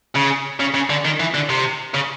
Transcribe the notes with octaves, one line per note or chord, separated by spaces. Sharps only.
C#3
C#3
C#3
D3
D#3
E3
D3
C3
C#3